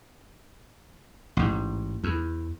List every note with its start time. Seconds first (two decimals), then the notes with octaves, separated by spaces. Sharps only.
1.37 A1 G#2
2.04 E2